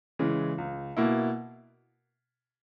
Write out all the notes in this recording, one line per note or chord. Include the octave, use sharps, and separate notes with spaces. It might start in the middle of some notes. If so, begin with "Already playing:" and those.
C#3 E3 G#3 C#4
C#2
B2 A#3 E4